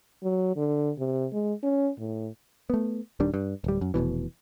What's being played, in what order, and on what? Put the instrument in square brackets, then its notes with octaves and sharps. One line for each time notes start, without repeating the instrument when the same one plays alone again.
[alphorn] F#3
D3
C3
G#3
C#4
A2
[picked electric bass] A3 B3
D#1 D#3 G3 D4
G2
D1 G3
F#2
F1 C2 B2 E3